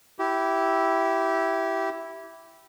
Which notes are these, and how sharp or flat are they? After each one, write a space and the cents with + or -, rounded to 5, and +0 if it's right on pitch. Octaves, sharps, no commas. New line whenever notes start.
E4 +0 G4 -15